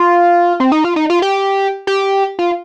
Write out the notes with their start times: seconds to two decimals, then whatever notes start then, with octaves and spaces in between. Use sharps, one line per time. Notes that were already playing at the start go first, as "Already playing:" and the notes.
Already playing: F4
0.60 C4
0.72 D#4
0.84 F4
0.96 D#4
1.10 F4
1.22 G4
1.87 G4
2.39 F4